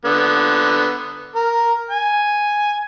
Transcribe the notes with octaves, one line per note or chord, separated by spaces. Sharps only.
D3 B3
A#4
G#5